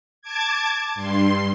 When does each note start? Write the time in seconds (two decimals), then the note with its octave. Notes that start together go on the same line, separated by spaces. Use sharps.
0.22 A5 D6 G#6
0.95 G2 C6